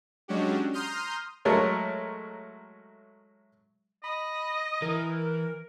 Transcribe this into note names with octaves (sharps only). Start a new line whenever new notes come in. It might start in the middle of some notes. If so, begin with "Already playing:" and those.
F#3 G#3 C#4 D4 F#4 G4
A#5 C6 D#6 F6 G6
F#3 G#3 A3 A#4 C#5
D#5 B5
E3 A#4